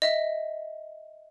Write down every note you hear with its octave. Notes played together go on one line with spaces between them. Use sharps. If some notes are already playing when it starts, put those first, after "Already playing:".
D#5 E5